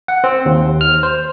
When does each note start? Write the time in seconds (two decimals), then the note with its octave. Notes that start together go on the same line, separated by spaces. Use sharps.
0.08 F#5
0.24 C4
0.46 D#2
0.81 F6
1.03 C5